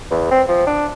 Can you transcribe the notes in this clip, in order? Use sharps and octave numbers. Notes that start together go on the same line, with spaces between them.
E2
C4
F3
D4